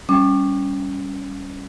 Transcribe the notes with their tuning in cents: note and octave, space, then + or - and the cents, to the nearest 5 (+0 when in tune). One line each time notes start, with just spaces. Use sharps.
G3 +0 C#4 +0 D6 +35